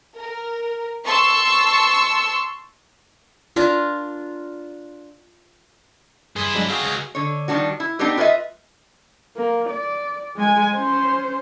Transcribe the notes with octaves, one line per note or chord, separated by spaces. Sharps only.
A#4
A5 C6 C#6 E6
D4 F4 A#4
G2 E4 G#4 C6 D#6
F#3 G#3 D4
C4 D4 F#4 G#4 F5
C#2
D3 C#5
D#3 F3 G3 A#3 D4 F#4
E4
B3 C4 D4 D#4 G4 B4
F4 B4 C#5 D#5 E5
A#3
D5
G#3 G#5
C#4 C5